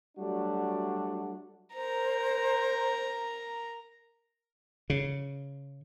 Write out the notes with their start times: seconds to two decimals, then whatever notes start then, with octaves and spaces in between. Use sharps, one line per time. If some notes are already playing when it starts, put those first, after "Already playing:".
0.17 F#3 G3 A3 D4 F#4
1.74 A#4 C5 A#5
4.90 C#3